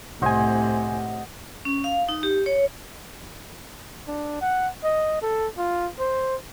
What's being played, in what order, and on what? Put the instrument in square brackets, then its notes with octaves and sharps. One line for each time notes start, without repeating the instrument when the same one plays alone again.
[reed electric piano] C2 G#5 [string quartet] A2 C3 [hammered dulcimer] C5 D#5 F#5
[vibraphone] C#4
F5
D#4
G4
C#5
[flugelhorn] D4
F#5
D#5
A4
F4
C5